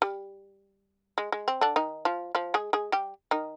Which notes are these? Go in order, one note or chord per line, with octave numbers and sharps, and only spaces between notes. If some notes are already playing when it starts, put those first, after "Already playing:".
G3
G#3
G#3
C4
D3 D4
D#3 D#4
F3 F4
F3 F4
G#3 G#4
G#3 G#4
G3 G4
D#3 D#4